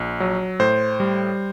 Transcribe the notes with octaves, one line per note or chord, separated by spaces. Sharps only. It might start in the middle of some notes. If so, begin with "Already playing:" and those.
Already playing: A#1
F#3
A2 C5
G3